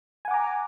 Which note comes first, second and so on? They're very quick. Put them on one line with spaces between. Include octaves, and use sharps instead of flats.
G#5 F#5 D6 A#5